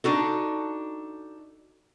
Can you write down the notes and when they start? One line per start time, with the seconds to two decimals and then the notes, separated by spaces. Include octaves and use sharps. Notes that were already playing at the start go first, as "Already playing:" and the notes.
0.04 D4 D#4 F#4 A4